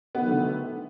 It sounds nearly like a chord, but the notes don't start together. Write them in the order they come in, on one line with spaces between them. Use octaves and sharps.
B3 D#3 F#3 A3 D3